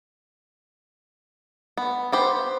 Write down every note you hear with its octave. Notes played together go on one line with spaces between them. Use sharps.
B3
B3 G4 C5